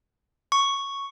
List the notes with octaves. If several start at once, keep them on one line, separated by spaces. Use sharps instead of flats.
C#6